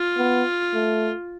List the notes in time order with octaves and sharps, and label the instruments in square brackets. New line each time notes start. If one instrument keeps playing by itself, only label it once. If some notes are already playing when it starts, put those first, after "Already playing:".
Already playing: [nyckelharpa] F4
[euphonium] B3
A3